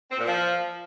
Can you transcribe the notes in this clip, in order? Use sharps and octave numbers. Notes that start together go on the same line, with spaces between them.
C4
A#2
F3